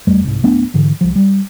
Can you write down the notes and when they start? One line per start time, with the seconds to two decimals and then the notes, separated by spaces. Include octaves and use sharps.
0.07 F#1 F2 G3 A3
0.24 C2 G#2
0.43 D1 A3 B3 D4
0.74 G#2 D3 E3
1.01 C2 F3
1.15 G3